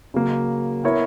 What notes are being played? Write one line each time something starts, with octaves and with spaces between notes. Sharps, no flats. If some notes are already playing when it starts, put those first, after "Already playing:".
C#3 F#3 A#3
B3 E4 A#4 C#5 E5